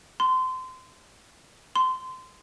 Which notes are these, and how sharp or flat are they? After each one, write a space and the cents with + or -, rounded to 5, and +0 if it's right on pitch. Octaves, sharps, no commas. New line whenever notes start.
C6 -25
C6 -20